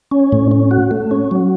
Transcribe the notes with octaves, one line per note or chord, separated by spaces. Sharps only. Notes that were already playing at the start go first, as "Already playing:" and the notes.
C#4
A2
C#4
F#4
A3
C#4
F#3